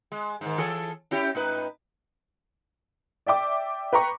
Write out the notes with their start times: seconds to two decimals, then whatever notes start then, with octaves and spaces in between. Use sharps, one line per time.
0.12 G#3
0.41 G#2 D#3
0.58 E3 G#4 A4
1.11 C#4 E4 G4
1.35 A2 D#4 B4
3.26 D5 E5 G5 D6
3.93 B4 G5 A#5 C#6